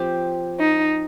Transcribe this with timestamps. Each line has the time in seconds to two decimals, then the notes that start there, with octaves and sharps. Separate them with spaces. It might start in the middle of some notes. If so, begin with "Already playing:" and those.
Already playing: F3 C4 G4
0.59 D#4